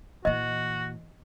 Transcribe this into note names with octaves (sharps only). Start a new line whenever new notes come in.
A#2 E3 F#4 D#5